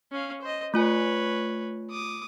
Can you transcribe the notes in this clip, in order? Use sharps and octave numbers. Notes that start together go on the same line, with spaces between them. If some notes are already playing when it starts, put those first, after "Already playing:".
C#4 F5
C5 D#5
A3 F4 B4 C#5 G#5
D6 D#6